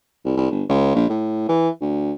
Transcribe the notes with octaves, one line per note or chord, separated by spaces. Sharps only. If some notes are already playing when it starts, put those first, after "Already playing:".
C2
C2
G1
C#2
A#1
A2
E3
D2